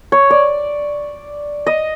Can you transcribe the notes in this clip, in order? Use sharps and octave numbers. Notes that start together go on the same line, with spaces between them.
C#5
D5
D#5